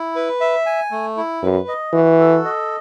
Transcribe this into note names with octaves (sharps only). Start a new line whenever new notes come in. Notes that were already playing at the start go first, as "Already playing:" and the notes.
Already playing: E4
B4
E5
G#5
A3
E4
F#2 B4
D#5
E3 F#4
A4
D#5